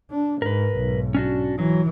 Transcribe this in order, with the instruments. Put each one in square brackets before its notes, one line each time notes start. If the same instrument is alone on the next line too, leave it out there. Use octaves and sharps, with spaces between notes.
[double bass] D4
[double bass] G#2 [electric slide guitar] A#4 B4
[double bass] B1 G#2
[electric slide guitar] C#4 D4 F#4
[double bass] E3 [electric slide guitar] F#3